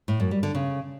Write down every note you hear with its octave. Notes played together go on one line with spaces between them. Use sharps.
A2
F#2
G3
D3
C#3